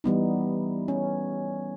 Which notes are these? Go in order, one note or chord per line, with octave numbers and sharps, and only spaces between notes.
E3 G3 B3 D#4
C#4